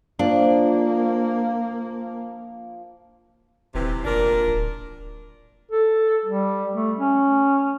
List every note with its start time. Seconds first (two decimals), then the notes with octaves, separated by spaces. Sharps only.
0.19 F3 A#3 D4
3.75 D#1 C3 E3
4.05 F1 A#2 D4 A#4
4.48 D1
5.71 A4
6.25 G3
6.74 A3
6.97 C#4